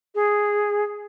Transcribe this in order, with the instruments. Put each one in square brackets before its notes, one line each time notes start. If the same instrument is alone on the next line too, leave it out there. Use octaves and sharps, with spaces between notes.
[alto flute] G#4